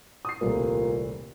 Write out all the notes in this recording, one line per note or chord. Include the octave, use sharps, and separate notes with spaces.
D#6 C7
D#1 C2 A#2 A3